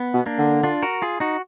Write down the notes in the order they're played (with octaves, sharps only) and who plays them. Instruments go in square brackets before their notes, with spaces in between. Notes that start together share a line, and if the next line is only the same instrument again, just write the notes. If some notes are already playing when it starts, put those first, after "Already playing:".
Already playing: [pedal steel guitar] B3
[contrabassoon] B2
[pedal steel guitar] A#3 D4
[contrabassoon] D3
[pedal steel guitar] D4 F4
F#4 A#4
F4 G#4
D#4 F#4